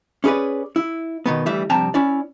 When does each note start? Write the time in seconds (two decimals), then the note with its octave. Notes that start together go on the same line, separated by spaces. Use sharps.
0.24 C#4 E4 G#4 A4 B4 D5
0.76 E4
1.26 B2 D#3 B3
1.46 D2 E3 G3 E5
1.70 G2 C3 F3 G5 A5 A#5
1.94 C#4 E4 D5